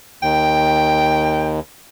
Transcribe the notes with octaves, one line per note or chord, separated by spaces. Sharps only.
D#2 G5